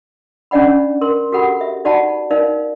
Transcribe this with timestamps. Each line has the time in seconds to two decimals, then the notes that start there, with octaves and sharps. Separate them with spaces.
0.51 C#4 D4 D5 F#5 B5
1.01 A#4 C6
1.32 F#4 G4 A4 A#4 F#5 B5
1.61 E5
1.85 D#4 F#4 D5 F#5 A5 B5
2.30 D#4 A#4 D5 F5